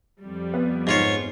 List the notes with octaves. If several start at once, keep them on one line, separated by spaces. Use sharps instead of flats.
F2 G3
B3
G#2 F4 C#5